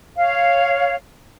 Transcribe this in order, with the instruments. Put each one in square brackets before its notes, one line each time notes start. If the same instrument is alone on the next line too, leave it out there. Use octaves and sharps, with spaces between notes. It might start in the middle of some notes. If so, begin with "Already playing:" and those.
[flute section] C#5 F5